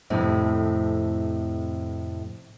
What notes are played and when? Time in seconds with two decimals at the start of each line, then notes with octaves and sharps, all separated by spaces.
0.10 F2 A2 C3